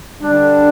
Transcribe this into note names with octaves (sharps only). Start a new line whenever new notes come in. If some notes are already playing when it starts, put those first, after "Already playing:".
D3 G3 D4